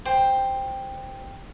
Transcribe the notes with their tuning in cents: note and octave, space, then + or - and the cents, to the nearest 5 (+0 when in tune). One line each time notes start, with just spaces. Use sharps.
C5 +0 G5 +10